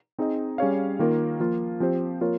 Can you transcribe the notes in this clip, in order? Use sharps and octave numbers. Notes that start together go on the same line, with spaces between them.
C4 D#4 G#4 D#5
G3 C#4 G#4 C#5 F5
D#3 A#3 F4 A#4
F3 A#3 F4
F3 C4 G4 C5
F3 A#3 F4 A#4 C#5